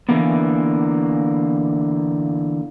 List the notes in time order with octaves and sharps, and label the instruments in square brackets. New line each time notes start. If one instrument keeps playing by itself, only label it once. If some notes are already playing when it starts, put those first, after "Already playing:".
[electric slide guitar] D3 E3 A#3 B3